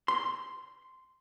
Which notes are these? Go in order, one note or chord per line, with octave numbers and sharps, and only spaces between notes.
C6